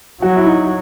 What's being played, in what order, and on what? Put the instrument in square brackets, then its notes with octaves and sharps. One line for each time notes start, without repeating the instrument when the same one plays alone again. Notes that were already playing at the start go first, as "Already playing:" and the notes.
[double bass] F#3 [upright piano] F#4
[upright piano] E4
D#4